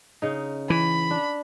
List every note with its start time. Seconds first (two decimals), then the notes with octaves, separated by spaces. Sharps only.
0.22 C#3 D#4
0.70 E3 B5
1.10 D4